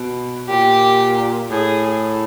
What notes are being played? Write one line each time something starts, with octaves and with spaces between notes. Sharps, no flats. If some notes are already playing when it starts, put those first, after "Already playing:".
Already playing: B2
A#2 G4
A2 G#4